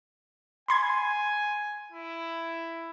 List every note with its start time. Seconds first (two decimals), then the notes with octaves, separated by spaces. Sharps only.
0.68 G#5 B5 C6 G#6
1.92 E4